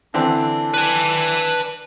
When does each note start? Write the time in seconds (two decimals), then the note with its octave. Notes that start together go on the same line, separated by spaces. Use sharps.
0.14 D3 E3 C4 D4
0.74 B4 G#5